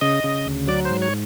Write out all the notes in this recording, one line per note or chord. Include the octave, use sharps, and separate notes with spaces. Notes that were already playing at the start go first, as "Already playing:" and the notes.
C#3 D#5
C#3
D2
F#3 D5
G#2 C5
C#5